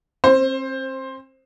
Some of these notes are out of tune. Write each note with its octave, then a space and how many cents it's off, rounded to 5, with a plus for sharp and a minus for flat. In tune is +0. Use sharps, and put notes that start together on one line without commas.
C4 +40 C5 +10